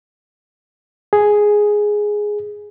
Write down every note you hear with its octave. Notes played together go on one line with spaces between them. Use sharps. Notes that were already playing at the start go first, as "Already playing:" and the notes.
G#4